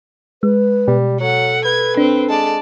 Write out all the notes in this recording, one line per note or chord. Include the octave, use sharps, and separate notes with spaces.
G#3 B4
B2 G3
F#3 A4 F#5
B4 G#6
C4 D4
G#3 D5 A5